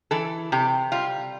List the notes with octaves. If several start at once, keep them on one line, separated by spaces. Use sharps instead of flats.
E3 A4
C3 G4
G3 F4